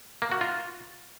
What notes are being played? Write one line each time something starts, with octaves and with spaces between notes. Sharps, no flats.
A#3
F#4
F4